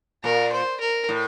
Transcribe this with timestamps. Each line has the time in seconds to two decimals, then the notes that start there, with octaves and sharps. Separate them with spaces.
0.24 A#2 A#4
0.52 C5
0.80 A#4
1.09 A2